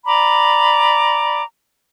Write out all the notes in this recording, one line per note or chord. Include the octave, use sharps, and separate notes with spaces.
D5 A#5 B5 D6